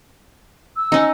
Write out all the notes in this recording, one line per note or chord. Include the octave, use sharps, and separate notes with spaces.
E6
C#4 D#4